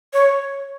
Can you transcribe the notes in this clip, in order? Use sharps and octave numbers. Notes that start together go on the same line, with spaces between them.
C#5